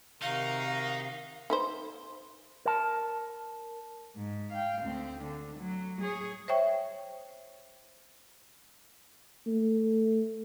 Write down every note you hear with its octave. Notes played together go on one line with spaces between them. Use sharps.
C3 D#3 D#4 F#4 A#4 F5
D#4 B4 C5
A#4 A5
G#2
F5 G5
D2 C4
D3
F#3
G#4 C#5
C5 C#5 E5 G5 C#6
A3